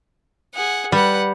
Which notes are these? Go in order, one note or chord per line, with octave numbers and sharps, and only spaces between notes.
G#4 F#5
G3 B4 F#5